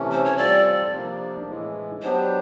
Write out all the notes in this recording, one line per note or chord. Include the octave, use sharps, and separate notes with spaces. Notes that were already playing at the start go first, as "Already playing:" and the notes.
Already playing: C3 E3 A3 C#4
C5
C#5
G3 C4 F4 A4 D5
C3 F3 A#3 D4
A2 E3 G#3
F#3 B3 D4 G4 C5